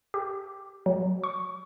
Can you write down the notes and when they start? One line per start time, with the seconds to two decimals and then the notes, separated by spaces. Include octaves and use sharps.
0.14 G4
0.86 F#3
1.24 C#6